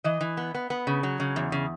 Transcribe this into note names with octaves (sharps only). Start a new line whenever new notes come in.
E3 D#5
E3
B3
B3
B3
C#3
F#3
C#3
E2
C#3